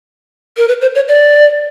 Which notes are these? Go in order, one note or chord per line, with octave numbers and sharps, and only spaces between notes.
A#4
B4
C5
C#5
D5